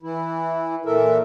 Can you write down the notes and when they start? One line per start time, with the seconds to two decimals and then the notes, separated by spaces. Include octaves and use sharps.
0.03 E3 E4
0.86 A#2 E3 A4 A#4 E5